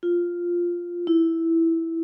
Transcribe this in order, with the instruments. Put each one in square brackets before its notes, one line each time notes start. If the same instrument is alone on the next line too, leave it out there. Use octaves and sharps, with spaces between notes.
[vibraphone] F4
E4